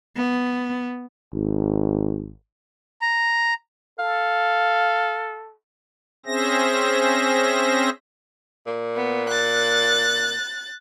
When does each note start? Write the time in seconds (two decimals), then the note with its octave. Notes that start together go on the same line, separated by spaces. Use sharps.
0.16 B3
1.33 G#1
3.01 A#5
3.99 A4 F5
6.26 C4 C#4 G#4 C5 E5 A#6
8.66 A#2
8.96 B3
9.29 F#6 A6